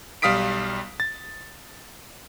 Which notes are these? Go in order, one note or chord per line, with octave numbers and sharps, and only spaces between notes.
B1 G3 F5 D#6 B6 D7
A6